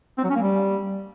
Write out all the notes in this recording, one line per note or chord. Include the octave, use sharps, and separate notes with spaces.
C4
F#3
C#4
A#3
G3